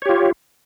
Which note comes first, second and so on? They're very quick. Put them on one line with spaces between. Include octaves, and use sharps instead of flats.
C#5 G4 F4